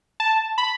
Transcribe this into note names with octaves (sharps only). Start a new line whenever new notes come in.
A5
B5